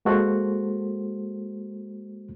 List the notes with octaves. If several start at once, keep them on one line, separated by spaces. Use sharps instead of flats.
G#3 A#3 F#4 A4 C5